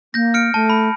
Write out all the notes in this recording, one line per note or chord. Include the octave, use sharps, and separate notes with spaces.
A#3 G6 A#6
F6 C#7 D7
A3 A5
B5